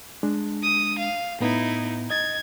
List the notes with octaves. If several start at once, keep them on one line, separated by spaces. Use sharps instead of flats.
G#3 D4
D#6
F5
A2 B3 D#4 E4
D#5 G#6 A6